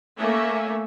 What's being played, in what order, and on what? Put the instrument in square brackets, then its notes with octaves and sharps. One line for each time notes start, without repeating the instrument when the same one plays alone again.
[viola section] A3 A#3 C#4 E5